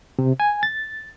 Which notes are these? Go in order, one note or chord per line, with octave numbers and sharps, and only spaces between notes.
C3
G#5
A6